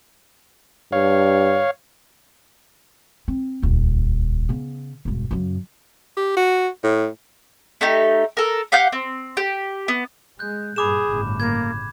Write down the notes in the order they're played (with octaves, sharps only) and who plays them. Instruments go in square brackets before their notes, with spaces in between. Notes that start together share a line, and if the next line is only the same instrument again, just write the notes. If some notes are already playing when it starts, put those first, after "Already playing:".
[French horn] G2 [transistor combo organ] C#5 F5
[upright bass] C4
D#1 C#2
C#3 B3
E1 G2
F#2 C#3
[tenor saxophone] G4
F#4
A2
[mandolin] A3 D#4 G4
A4 A#4
G4 F5 F#5 G6
C4
G4
B3
[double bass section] G#3 [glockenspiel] F#6 G6
[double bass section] G2 A#2 [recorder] G#4 [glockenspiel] B5 D6 E7
[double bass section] G1 A2 C#3
[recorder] A#3 [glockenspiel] G#6